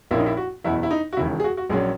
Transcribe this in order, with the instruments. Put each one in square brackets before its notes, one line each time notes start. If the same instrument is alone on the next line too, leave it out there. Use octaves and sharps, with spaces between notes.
[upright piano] A#1 A#2 A#3 C#4 E4
D#4
E4
F#4
F#1 E2 B2 E4
E4
D#4
F#4
E1 D#2 C#3 E4
G#4
F#4
F#4
A#1 A#2 F#3 C#4 G#4